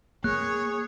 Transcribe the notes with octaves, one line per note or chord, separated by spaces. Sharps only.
A#3 G#4 C#5 F#6